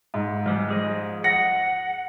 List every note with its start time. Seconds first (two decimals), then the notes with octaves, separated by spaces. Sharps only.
0.14 G#2
0.46 F3 G3 G#3
0.69 F3 G#4 D#5
1.24 F#5 A#6